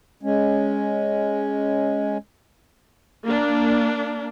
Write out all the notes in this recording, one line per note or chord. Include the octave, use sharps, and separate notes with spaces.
G#3 C#4
A#3 D4